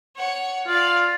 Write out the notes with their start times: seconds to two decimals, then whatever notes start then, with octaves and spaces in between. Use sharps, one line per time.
0.16 C#5 F#5
0.67 F4 D5 F5